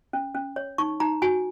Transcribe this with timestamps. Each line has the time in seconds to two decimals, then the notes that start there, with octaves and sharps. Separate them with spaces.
0.13 C#4
0.35 C#4
0.56 C#5
0.78 D#4 C#6
1.00 D#4 A#5
1.22 F#4 G#5